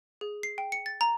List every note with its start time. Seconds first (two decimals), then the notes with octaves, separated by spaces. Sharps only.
0.21 G#4
0.43 C7
0.58 G5
0.72 C#7
0.86 A6
1.01 A#5